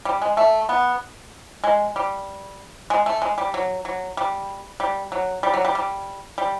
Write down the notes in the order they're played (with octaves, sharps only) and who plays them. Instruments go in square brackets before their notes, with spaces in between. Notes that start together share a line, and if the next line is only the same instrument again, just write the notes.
[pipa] G3
G#3
A3
B3
G#3
G3
G#3
A3
G#3
G3
F#3
F#3
G3
G3
F#3
G3
F#3
G3
G3
G3